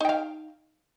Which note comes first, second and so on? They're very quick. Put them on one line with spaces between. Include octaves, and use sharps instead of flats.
D#4 G5 F5